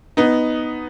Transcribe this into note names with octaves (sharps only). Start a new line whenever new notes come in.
B3 D#4